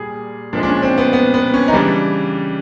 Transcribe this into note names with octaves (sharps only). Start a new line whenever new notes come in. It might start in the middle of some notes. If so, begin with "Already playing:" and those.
Already playing: A#2 G3 G#4
A#2 F3 G#3 D4
D4
C#4
C4
B3
B3
B3
C#4
D#4
C#3 E3 G3 D4